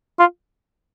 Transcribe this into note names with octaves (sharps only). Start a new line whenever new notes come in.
F4